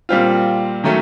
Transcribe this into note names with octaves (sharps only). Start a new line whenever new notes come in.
A#2 G3 C4 F4
D#3 F#3 A3 C#4